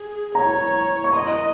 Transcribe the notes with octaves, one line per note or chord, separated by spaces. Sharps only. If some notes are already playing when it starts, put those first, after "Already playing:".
Already playing: G#4
C#5 A#5
C#6
D#5 C6